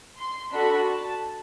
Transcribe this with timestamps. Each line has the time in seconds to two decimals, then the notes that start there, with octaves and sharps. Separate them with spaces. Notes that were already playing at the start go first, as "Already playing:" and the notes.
0.18 C6
0.52 D4 F#4 A4 B5
0.85 A5